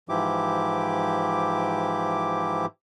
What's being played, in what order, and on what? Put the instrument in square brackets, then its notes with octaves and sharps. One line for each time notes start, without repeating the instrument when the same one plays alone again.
[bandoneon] G#2 E3 F3 E4 G4 D6